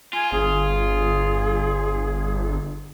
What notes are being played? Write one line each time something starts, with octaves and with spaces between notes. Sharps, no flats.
F4 G#5
G1 G#4